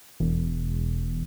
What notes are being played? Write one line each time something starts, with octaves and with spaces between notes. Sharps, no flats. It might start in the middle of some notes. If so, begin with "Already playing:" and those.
E1